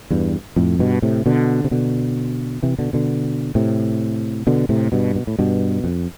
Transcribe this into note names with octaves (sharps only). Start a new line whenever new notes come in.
E2 G2
F2 A2
G2 B2
A2 C3
B2 D3
C3
B2 D3
C3 E3
B2 D3
B2 D3
A2 C3
B2 D3
A2 C3
G2 B2
B2
A2
G2 B2
F2